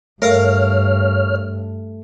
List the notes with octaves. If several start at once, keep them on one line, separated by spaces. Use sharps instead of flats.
G2 A3 A#4 C#5 F5 A#5 F6